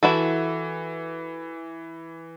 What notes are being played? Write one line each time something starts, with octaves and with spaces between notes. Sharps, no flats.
E3 E4 F#4 A4